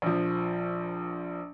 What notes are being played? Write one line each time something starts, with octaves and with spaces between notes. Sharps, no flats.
A#1 F3